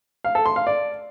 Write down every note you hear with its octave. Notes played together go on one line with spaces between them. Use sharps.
F5
A4
C6
F5
D5